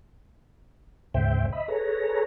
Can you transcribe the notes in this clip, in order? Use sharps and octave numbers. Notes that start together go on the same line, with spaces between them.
D2 G#2 C#3 C5 E5 G5
D#5 E5 B5
G#4 A4 B4 C#5 A#5